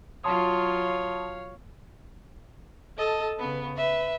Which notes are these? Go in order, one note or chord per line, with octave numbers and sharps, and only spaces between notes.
F#3 F4 C#5 F5 A5 C6 D#6
A4 D#5 A5
C#3 B3 B4
B4 E5